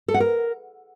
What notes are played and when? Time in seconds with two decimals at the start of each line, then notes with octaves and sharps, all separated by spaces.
0.08 A4
0.14 F#5
0.20 A#4